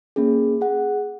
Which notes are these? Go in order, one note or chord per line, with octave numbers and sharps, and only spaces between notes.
A#3 C#4 G#4
G#4 F#5